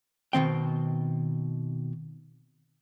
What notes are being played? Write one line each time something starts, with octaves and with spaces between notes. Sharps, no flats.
B2 D#3 C4 G5